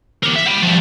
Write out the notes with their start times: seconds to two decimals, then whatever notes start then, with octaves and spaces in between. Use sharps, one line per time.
0.23 G4 A#4
0.36 E5
0.47 G5 B5
0.62 F3 G3